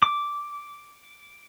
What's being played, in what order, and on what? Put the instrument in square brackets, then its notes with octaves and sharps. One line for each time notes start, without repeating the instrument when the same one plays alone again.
[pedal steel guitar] D6